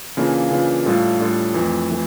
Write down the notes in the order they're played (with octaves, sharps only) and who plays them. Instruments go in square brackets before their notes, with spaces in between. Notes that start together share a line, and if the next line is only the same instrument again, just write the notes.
[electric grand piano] C#3 E3 A#3 D4 F4
C#3 E3 A#3 D4 F4
A2 G3 D4 F4 A4
A2 G3 D4 F4 A4
F2 E3 A3 E4
E3 A3